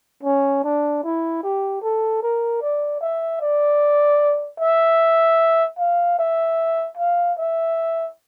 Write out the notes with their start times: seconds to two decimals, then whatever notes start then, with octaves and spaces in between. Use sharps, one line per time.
0.23 C#4
0.63 D4
1.03 E4
1.43 G4
1.82 A4
2.22 A#4
2.61 D5
3.01 E5
3.41 D5
4.60 E5
5.78 F5
6.19 E5
6.97 F5
7.38 E5